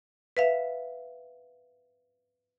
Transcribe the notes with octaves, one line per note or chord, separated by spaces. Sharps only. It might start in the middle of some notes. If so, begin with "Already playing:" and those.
B4 E5 F5